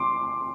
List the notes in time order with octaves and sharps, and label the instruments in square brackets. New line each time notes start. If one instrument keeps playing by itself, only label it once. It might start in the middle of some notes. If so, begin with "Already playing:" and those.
Already playing: [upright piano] C6 D6